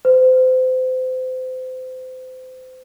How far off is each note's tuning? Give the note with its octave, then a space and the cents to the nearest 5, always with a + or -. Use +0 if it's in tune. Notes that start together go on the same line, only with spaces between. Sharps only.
C5 -30